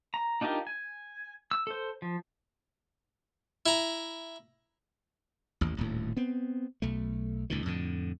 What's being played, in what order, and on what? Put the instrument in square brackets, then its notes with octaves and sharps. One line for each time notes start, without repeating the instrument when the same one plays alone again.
[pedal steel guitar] A#5
D4 D#4 F4 G4 A#4
G#5
E6
A4 C5
F3
[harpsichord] E4 A#5
[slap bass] A1 D#2
D#1 D2 A2
B3 C4
B1 A3
C#2 A#2 D#3
F2 A2 D3